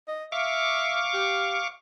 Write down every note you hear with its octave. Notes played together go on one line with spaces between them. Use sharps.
D#5
E5 F5 C#6 D6
G4